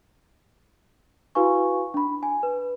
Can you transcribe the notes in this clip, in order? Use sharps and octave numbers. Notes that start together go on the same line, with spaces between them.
E4 F#4 B4 F5 G#5 C#6
D4 B5
G#5
B4